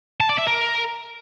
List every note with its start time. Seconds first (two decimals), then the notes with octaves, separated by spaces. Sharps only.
0.20 A5
0.29 D5
0.38 E5
0.47 A#4